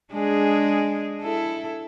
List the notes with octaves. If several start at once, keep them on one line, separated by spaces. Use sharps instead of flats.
G#3 D4 G#4
E4 A4